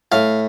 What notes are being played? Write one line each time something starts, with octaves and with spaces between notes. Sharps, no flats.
A2 F5